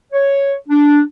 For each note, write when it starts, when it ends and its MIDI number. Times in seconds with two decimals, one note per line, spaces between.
0.13 0.53 73
0.69 1.01 62